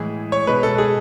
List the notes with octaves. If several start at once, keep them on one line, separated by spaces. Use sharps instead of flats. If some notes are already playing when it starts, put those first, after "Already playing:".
Already playing: A2 E3 G#3 G#4
C#5
B2 G#3 B4
A4
G#4